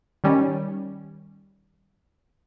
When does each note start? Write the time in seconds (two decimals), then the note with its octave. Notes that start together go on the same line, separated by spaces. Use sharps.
0.24 D#3 G3 C#4